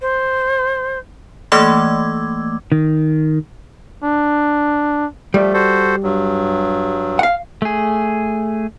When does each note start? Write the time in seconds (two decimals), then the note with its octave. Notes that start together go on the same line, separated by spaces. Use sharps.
0.01 C5
1.52 E3 A3 A#3 D6 E6 G#6
2.72 D#3
4.04 D4
5.34 F3 G3 A3
5.54 F#4 A4 C5
6.03 G2 F#3
7.19 F5 F#5
7.62 A3 G#4